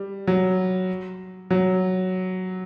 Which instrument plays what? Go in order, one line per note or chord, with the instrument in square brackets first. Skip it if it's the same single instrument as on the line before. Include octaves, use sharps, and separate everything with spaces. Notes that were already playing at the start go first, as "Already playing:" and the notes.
Already playing: [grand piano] G3
F#3
F#3